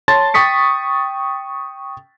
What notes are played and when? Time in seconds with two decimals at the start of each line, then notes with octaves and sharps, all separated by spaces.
0.08 C#5 A5 C6 A6
0.34 G5 C#6 D#6 B6 C#7